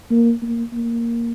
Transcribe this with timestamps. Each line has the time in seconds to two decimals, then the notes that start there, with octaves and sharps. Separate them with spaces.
0.11 A#3
0.42 A#3
0.73 A#3